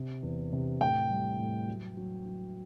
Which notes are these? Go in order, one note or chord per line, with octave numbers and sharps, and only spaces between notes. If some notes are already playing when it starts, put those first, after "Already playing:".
Already playing: C3
E2
C3
A2 G5
G3
A2
F#3
F#3
F#3